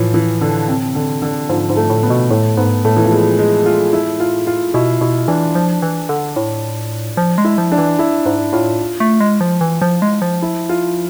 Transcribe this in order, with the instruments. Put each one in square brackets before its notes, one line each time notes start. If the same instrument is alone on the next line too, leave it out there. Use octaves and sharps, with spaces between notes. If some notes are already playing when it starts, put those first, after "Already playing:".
Already playing: [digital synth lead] A2 [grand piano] E3 F3
[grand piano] E3
D3
C3
D3
D3
[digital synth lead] G#2 [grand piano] F3
[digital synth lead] G#2
[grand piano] A3
[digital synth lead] A2
[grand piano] B3
[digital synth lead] B2
[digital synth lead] A2 [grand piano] A3
[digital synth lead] G#2 [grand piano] B3
[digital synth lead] A2 [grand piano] A3
[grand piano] E3
F3
G#3
G#3
F4
E4
F4
F4
[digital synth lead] B2 [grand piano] E4
[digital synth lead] B2 [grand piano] E4
[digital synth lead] E3 [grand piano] D4
[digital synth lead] F3
E3
D3
A2
F3
G#3
[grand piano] E4
[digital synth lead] F3
[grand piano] D4
[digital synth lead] E3
[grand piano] E4
[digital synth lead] G#2 [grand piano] D4
[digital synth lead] A2 [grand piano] F4
[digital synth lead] A3
G#3
F3
E3
F3
G#3
F3
[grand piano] E4
F4